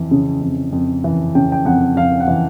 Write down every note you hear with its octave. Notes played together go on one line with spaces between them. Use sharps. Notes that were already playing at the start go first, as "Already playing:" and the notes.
Already playing: F2 E3
C#3
F2
F2
E3
C#3 G5
G5
F2 F#5
F2 F5
F#5
E3